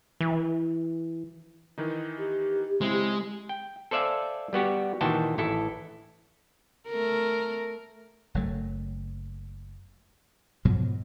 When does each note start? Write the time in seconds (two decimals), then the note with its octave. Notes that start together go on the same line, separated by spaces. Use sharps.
0.21 E3
1.78 D#3 E3 D#4
2.18 G4
2.81 C#3 G#3 C4 E4
3.49 G5
3.91 A4 C5 D5 E5 F5 G#5
4.53 G3 B3 F#4 G4
5.01 A#2 D#3 E3 F#4 G5 A5
5.38 A1 E4 A4
6.89 A3 A#4
8.34 F#1 F#3 A3
10.65 G#2 B2 F3 F#3